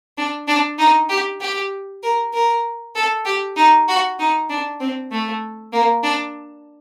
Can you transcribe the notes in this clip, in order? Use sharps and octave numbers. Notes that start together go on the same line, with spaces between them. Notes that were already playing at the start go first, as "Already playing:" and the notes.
D4
D4
D#4
G4
G4
A#4
A#4
A4
G4
D#4
F#4
D#4
D4
C4
A3
A#3
D4